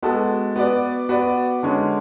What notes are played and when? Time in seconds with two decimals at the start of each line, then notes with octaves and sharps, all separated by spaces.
0.02 G#3 B3 F#4 A4
0.56 B3 F#4 B4 D5
1.09 B3 F#4 B4 D5
1.63 D3 G#3 C#4